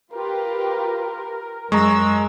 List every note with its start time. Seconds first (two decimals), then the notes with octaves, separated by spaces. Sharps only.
0.13 F4 G4 A#4 B4
1.72 F#2 G#3 A#5 C#6 E6